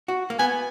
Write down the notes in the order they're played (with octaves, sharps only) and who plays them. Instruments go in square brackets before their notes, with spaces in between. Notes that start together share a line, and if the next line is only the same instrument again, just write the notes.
[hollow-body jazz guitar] F#4
A#3
[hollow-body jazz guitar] B3 [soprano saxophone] G#5